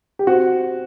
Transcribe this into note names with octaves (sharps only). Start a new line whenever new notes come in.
G4
C4 F#4